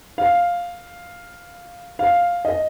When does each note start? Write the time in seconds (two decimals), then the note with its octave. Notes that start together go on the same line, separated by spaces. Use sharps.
0.18 F5
1.99 F5
2.45 D#5